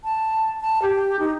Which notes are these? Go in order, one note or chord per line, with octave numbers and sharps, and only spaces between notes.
A5
A5
G4
D#4